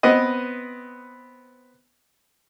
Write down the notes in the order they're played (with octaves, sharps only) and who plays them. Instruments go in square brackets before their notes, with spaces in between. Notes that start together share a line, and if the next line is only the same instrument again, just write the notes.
[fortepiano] B3 C4 B4 D#5